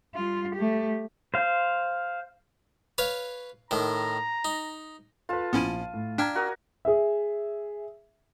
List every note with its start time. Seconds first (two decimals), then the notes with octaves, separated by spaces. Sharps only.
0.15 G3 F4
0.55 A3 G4
1.34 C5 F5
2.98 B4 C#5 F5
3.71 A2 D#3 A#5
4.45 D#4
5.29 F4 A4 B4 A5
5.53 A#1 F3 B3 C#4 E4 D#7
5.94 A2
6.18 D4 D5 G5 A#5 F6 G#6 B6
6.35 F#4 A#4 D#6
6.85 G#4 E5